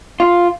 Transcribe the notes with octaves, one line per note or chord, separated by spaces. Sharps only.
F4